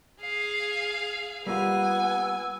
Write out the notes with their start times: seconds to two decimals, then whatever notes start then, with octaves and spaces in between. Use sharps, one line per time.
0.21 G#4 F5 C7
1.46 G3 A#3 B3 F4 F#5 G#5 E6